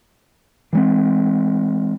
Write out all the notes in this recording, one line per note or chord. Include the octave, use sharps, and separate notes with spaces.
E3 G#3 C4